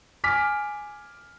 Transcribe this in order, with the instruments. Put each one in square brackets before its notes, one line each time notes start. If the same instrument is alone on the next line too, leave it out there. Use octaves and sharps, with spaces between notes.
[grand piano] G#5 D6 F6 B6